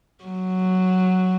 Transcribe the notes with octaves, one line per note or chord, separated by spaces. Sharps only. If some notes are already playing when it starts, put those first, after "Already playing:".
F#3